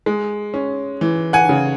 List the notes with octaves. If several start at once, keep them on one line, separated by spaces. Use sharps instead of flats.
G#3
C#4
E3
F#5 G#5
C#3